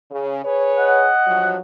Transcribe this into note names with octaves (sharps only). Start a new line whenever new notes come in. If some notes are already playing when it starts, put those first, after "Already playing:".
C#3
G#4 B4 C#5
D#5 F#5
G2 F3 F#3